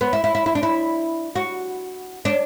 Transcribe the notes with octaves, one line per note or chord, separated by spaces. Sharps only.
B3
E4
E4
E4
E4
D4
E4
F#4
D4